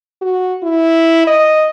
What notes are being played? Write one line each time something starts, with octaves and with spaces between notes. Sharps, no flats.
F#4
E4
D#5